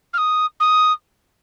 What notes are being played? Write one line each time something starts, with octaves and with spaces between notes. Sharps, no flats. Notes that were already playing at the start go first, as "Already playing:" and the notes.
F6
D#6
D#6